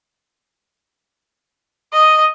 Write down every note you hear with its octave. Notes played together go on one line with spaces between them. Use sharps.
D#5